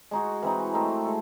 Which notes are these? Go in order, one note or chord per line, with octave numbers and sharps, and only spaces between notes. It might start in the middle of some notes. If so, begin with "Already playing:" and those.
G#3 D#4 F#4
E3 C4 D#4
A3 C4 D#4
G#3 A4